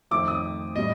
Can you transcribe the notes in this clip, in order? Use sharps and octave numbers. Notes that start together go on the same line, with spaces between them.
F2 D#3 A3 D6
D#6
A2 G3 D#5